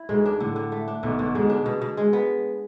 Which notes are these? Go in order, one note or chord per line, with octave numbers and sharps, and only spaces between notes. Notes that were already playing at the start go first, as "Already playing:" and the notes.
Already playing: E4
B1 B2 G#3
D4
A2 D3
D3
A3
D4
B1 B2 D3
B1 B2 D3
B1 B2 G#3
D4
B2
B2
G#3
B3